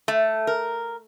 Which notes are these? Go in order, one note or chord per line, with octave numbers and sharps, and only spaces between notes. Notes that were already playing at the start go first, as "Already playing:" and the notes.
A3
A#4